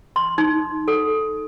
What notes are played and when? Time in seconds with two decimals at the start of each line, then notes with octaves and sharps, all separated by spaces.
0.16 C6
0.38 D#4
0.88 A4